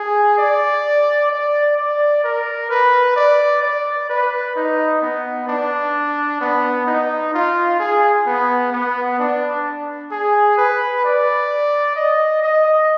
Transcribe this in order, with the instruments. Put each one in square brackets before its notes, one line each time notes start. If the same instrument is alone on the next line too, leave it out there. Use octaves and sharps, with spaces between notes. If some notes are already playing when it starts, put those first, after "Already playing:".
Already playing: [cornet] G#4
D5
D5
D5
A#4
B4
D5
D5
B4
D#4
B3
D4
B3
D#4
F4
G#4
B3
B3
D4
G#4
B4
D5
D#5
D#5